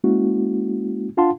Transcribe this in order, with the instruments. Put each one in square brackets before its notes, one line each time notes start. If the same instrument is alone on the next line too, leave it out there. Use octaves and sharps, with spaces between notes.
[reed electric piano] G#3 A#3 C#4 E4 F#4
D4 F4 F5 F#5 A5 C6